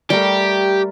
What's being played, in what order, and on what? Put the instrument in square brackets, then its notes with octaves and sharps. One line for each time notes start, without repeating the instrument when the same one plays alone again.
[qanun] G3 A3 A#4 [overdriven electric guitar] G4